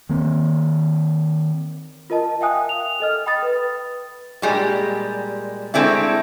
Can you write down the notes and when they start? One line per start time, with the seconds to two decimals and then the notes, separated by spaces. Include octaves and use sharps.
0.09 D#3 A#3 C4
2.10 F4 A#4 D#5 A5
2.41 E5 F5 G5 G#5 D#6 F#6
2.69 F7
3.00 A4 D#5 F6
3.26 G5 B5 D#6 A6
3.42 B4
4.42 A#2 G3 G#3
5.74 G#3 A3 C4 D4 E4